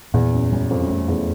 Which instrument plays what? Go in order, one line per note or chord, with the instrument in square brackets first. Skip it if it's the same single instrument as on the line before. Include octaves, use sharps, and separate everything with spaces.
[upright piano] E2 [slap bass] A#2
[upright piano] F#2
[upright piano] F#2 [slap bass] G3
[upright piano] F2
F#2
[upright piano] F2 [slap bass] A3
[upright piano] E2